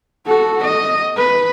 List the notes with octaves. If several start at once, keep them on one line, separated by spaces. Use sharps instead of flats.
F#4 A4
D#5
B4